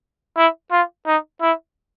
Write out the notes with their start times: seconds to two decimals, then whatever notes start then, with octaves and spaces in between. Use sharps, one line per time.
0.37 E4
0.71 F4
1.06 D#4
1.41 E4